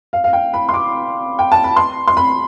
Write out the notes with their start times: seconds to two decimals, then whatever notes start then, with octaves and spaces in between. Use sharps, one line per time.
0.13 F5
0.24 F5
0.33 G5
0.54 B5
0.69 C6
0.74 D6
1.39 G5
1.52 A5
1.64 B5
1.77 C6
2.08 C6
2.17 B5